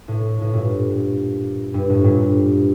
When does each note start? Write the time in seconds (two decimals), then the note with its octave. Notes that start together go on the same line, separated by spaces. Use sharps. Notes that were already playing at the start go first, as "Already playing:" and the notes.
0.08 A2
0.41 A2
0.54 G2 A#2
1.74 G2
1.90 A2
2.04 G2 A#2